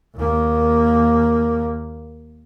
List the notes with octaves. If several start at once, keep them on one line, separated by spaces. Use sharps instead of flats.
D#2 A#3